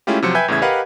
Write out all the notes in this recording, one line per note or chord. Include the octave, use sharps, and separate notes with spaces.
G#3 A3 C#4 E4 F4 G4
C3 F3 F#3 C5 C#7
B4 E5 G5 G#5 G6 G#6
E2 A2 C#3 E5 G#6
G4 A#4 B4 D#5 F5 F#5